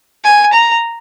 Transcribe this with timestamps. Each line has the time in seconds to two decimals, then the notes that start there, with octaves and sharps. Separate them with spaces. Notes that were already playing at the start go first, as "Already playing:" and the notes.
0.24 G#5
0.53 A#5